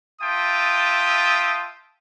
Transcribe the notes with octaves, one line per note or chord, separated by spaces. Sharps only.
F4 E5 G5 A5 D#6